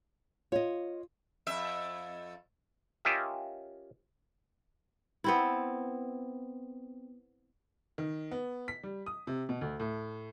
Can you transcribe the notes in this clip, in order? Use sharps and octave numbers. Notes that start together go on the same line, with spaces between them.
F4 C#5 D#5
F2 E5
C#4 F4 G4 A#4 D#5 E5
B3 C4 E4
D#3
B3
B6
G3
D#6
C3
B2
D2
A2